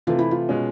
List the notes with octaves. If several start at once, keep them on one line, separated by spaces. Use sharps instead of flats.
C3 E3 A3 F4
E4
F4
B2 G#3 C#4